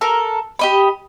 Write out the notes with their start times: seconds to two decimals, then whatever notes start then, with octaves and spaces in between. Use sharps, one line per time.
0.01 A4 A#4
0.59 G4 D#5 B5